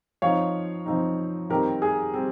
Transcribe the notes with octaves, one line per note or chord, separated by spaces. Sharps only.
F3 C4 D#4 C#5 F5
F3 C4 D#4
D#3 G3 C4 G4 A#4
G#4
G3 C4